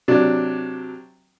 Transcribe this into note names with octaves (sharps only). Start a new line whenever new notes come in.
C3 F#3 D4